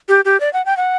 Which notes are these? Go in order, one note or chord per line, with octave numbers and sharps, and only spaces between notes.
G4
G4
D5
F#5
G5
F#5